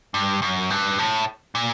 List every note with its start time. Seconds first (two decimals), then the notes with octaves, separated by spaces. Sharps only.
0.14 G2
0.42 F#2
0.70 G2
0.98 A2
1.55 A#2